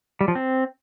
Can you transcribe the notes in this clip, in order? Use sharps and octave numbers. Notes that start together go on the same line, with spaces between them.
G3
F3
C4